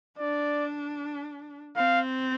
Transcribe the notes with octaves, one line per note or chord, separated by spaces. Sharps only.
D4 D5
C4 F5